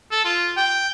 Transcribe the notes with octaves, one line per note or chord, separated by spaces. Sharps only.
A4
F4
G5